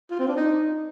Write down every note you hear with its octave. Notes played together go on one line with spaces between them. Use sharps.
F4
C4
D4
D#4